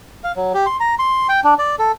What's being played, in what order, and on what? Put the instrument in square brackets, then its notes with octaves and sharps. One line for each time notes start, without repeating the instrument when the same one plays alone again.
[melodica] F5
F#3
G4
C6
A#5
C6
G5
D4
D5
A4